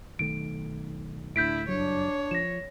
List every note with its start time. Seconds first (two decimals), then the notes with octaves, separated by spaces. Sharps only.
0.19 B1 D#3 A3 D7
1.36 D2 A2 D4 E4 G6 B6 D7
1.68 F#1 G2 F#3 D4 C#5
2.31 F3 A#6 E7